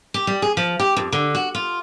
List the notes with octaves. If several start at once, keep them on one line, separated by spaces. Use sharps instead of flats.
G4
G3
G#4
F3
G4
F2
D3
F#4
F4